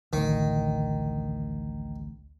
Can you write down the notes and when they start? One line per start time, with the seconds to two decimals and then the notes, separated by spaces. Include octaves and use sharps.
0.13 A1 D2 D#3